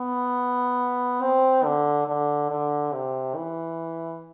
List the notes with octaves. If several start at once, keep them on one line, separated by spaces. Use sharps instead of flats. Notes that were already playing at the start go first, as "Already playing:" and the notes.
Already playing: B3
C4
D3
D3
D3
C3
E3